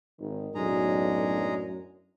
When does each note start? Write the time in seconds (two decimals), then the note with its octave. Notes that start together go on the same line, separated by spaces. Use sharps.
0.20 G#1 D#3
0.55 B1 F#2 A2 G#3 D4 G#4 A#5